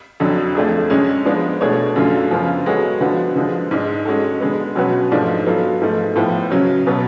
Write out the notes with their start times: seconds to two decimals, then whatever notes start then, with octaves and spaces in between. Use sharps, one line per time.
0.20 F2 D3 F#3
0.55 F2 F3 A3 D4 G#4
0.90 F#2 D3 G#3 C#4
1.25 F3 G#3 B3 D4
1.61 B2 A3 D4 G#4 C#5
1.96 F#2 D3 F#3 A3 F4
2.31 F#2 C#3 F3 B3 F4
2.66 G#3 B3 F#4 A4 C#5
3.01 D3 F3 B3 F#4 B4
3.36 D3 F3 G#3
3.71 G#2 G#3 D4
4.05 G#3 C#4 F#4 A4
4.41 D3 G#3 B3
4.75 B2 F#3 C#4 F#4 B4
5.12 G#2 F3 A3 D4
5.46 F#3 B3 F4 A4
5.81 G#2 F3 A3
6.16 A2 F3 B3
6.51 C#3 F#3 C#4
6.87 B2 F#3 B3